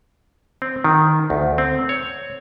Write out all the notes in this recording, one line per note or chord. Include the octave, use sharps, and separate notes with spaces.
C4
D#3
D2
C4
C#5